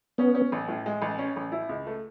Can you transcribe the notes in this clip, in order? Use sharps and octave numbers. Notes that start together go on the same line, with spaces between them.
B3 C#4
C#4
A1
A2
G#3
A1
C#4
A1
E4
C#2
A3